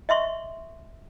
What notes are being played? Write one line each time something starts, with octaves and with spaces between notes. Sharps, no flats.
D#5 E5 C6 C#6